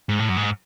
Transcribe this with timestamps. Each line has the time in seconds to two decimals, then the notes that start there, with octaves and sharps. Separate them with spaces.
0.09 G#2
0.19 A2
0.29 F#2
0.37 G#2